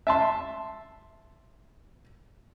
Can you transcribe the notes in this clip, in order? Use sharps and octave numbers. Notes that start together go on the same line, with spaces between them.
E5 A5 C6